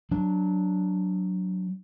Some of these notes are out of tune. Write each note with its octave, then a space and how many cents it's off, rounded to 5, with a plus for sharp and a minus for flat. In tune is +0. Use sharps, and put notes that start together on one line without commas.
F#3 +0 D4 +0